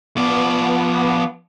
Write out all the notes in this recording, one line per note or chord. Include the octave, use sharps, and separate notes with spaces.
F3 B3 D5